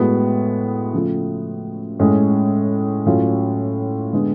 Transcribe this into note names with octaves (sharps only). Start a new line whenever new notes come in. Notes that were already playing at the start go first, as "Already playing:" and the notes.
Already playing: A2 G#3 B3 F#4
C#3 F3 A3 F4
A2 G#3 C#4
A2 F#3 C#4 F4
D3 G#3 B3